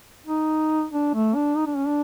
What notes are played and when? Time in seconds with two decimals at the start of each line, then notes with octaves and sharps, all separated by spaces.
0.27 D#4
0.92 D4
1.14 A3
1.35 D4
1.57 D#4
1.66 D4
1.76 C#4
1.87 D4